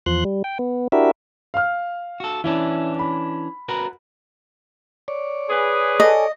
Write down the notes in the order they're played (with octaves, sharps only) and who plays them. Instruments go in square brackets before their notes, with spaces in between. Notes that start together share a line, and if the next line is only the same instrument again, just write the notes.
[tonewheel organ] E2 F3 C6 F#6
G3
G5
B3
D4 E4 F#4 G4 A#4 E5
[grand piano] F5 F6
[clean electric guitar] F#4 A4
[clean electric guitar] E3 C#4 D4 [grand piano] E4
[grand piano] B5
[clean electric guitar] F#4 A#4 B4
[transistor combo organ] C#5 D5
[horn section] G#4 B4
[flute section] A4 G#5 [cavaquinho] D#5